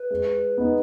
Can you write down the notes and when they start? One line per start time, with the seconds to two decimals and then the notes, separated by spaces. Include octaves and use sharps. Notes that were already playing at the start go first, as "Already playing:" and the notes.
Already playing: B4
0.11 G#3
0.58 B3 D#4